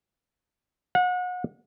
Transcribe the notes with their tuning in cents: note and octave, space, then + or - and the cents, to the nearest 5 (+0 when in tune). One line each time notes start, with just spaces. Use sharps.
F#5 -35